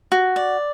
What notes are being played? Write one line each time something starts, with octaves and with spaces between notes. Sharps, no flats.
F#4
D5